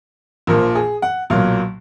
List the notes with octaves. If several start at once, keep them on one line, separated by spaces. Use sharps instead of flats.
A#1 A#2 F3 A#4
G#4
F#5
B1 A#2 F#3 F5